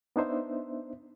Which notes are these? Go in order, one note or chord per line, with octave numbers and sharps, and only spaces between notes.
B3 D4 D#4 C5 E5